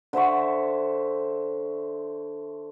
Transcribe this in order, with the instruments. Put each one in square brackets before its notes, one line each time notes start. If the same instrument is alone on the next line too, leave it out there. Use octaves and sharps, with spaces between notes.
[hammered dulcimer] D3 C5 E5 C#6